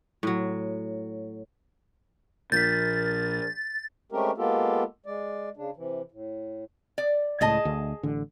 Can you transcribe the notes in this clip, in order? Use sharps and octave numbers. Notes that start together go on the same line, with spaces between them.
A2 F#3
A#1 A#2 A#4 G6 A6 B6
G#3 A3 C4 C#4 G4 A#4
G#3 A#3 B3 F4 G4 A4
G#3 D5
C#3 D4
C3 E3
A2
D5
C#2 A2 G#4 D#5 A5
D2
A1 D3